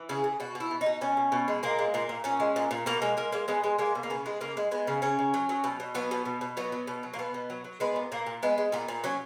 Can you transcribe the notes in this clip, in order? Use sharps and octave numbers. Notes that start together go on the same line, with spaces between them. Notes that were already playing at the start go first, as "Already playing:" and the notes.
Already playing: E3
C#3 G#4
C#3
B2 F#4
B2
E4
B2
D#4
B2
B2 C#4
B2
B2
G#3
A#2 A#3
G#3
A#2 A#3
A#2
A#2 C#4
G#3
A#2
A#2
B2 A#3
G#3 A#3
G#3 A#3
G#3 A#3
G#3 B3
G#3
G#3 A#3
B2
A#3
C#3 B3
G#3
C#3 A#3
G#3
G#3 B3
C#3
C#3 C#4
C#3
F#3
F#3
B2
B2
F#3 B3
B2
B2
B2
F#3 B3
F#3
B2
F#3
A#3
B2 B3
B2
F#3
F#3
G#3 B3
A#2
A#2 A#3
A#2
G#3 B3
G#3
A#2 B3
A#2
F#3 C#4